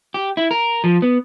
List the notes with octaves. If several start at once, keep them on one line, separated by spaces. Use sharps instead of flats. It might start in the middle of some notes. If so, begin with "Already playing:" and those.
G4
E4
A#4
F3
B3